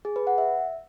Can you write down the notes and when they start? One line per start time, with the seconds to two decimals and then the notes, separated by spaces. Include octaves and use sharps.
0.05 G#4
0.16 B4
0.27 F#5
0.38 E5